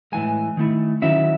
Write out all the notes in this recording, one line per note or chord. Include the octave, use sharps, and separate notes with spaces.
A2 E3 G#3 G#5
D#3 A3 E4
D#3 F#3 C#4 E4 E5